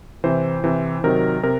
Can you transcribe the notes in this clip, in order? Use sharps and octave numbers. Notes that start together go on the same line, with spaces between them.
C3 E3 C5
C3 E3
C3 D#3 F#3 A#4
C3 A#4